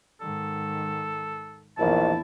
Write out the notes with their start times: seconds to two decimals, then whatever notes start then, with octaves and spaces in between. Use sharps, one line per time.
0.21 G#2 D#3 A4
1.78 A#1 E2 D#3 E4 A5